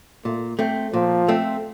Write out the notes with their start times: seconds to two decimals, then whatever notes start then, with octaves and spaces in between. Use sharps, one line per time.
0.25 A#2 A3
0.59 A3 C4
0.93 A#2 F3
1.28 A3 C4